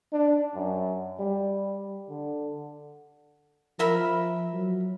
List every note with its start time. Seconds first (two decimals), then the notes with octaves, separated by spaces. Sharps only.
0.13 D4
0.55 F#2
1.19 G3
2.09 D3
3.79 F3 A#4 E5 B5
4.53 F#3